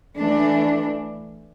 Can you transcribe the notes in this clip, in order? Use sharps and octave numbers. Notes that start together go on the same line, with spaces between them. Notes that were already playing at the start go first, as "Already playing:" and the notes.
E3 A3 D4